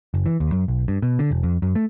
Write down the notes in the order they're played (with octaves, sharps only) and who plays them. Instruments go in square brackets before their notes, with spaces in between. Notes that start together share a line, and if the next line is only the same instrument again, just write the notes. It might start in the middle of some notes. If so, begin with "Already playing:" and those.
[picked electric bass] F#1
E3
D#2
F#2
B1
G2
B2
D3
E1
F2
F#2
A3